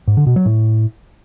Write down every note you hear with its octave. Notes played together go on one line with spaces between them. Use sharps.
G#2
D3
B2
F#3
A2